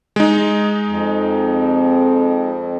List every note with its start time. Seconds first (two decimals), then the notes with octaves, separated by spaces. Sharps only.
0.16 G#3 D#4
0.87 F2